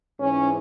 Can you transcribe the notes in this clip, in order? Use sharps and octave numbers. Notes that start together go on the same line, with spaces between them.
G#2 E3 C#4